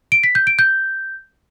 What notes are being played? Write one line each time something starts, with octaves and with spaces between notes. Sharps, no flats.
D7
B6
G6
D7
G6